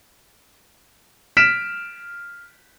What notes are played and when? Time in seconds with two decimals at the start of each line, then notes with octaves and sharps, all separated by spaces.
1.37 F6 B6 D7 E7